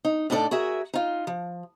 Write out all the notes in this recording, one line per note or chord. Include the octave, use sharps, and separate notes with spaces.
D#4
A2 D4 D#4 A4 D5
F#4 G#4 A#4 E5
D#4 F4
F3